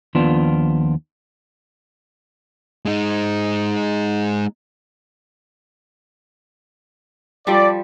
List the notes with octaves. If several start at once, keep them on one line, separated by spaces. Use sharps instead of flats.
D#2 F3 B3 D4 F4
G#3 D#4
F3 G3 A4 D5